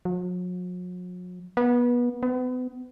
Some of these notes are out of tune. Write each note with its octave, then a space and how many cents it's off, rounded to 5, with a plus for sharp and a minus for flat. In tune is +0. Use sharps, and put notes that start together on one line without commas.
F#3 -45
B3 -25
B3 +35